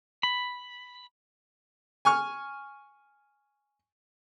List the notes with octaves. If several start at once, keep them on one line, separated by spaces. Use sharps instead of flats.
B5
G#5 C#6 F6